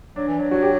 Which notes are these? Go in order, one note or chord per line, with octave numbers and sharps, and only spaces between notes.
F#3 D4
E3
F#3
F#3 F#4
G4